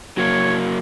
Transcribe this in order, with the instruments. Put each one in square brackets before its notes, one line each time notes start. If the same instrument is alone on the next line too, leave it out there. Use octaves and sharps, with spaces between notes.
[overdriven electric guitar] F#3 A#3 [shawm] C#5